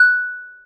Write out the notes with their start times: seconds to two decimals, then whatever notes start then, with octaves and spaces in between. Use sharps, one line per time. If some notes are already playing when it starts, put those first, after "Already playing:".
Already playing: F#6